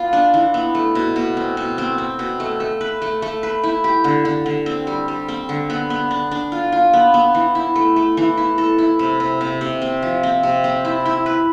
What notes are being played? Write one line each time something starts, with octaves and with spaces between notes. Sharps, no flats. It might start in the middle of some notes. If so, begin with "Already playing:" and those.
Already playing: B3 F4
D4
E3
B3
A3
B2
B2
C4
B2
C4
C4
B2
A3
A3
B4
A3
A3
B4
E4
G4
D3
D3
D3
C4
G3
G3
C4
D3
B3
B3
D4
D4
F4
F4
B3
B3
E3
E4
A3
A3
E3
E4
A4
E4
C3
C3
C3
C3
C4
F3
C4
C3
C4
E4
E4
B4